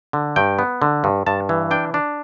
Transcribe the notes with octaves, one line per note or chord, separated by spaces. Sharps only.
D3
G2 G5
B3
D3
G2
G2 A5
E3
D4 G5
D4